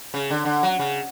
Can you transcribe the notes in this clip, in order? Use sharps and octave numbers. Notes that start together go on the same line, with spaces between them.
C#3
D3
D3
F#3
C#3